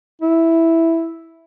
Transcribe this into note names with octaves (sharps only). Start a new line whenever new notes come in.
E4